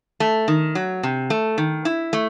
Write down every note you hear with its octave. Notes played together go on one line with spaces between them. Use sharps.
A3
D#3
F#3
C3
A3
D#3
E4
A3